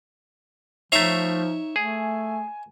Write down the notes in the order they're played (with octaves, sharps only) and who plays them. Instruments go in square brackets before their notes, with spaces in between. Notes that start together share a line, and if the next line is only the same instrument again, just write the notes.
[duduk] F3 [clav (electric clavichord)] A3 F5 [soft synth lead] D#4 [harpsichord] C#5 E5 A#5
[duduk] A3 [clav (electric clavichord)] G#4 [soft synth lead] G#5